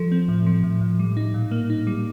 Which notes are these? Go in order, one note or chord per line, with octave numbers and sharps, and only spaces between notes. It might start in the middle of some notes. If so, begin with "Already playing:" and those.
Already playing: F3 A4
C4
A2
F3
A2
A2
G3
D#4
A#2
A#3
D#4
G3